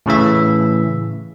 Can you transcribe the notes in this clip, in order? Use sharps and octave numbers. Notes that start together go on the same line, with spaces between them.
A2 C#3 E3 E5